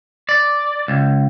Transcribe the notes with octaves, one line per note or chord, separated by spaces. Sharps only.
D5
C#2